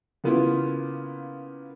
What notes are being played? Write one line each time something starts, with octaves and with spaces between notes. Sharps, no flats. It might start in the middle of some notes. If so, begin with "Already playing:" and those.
C#3 A#3 B3 E4 F4